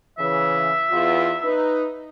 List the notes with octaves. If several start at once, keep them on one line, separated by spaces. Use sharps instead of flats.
C#3 E3 E5
E2 F4
D#4 B4